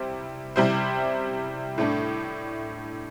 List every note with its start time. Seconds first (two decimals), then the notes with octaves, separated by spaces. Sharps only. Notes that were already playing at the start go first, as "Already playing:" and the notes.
Already playing: C3 G3 E4 C5
0.56 C3 G3 E4 G4 C5
1.78 A2 A3 D4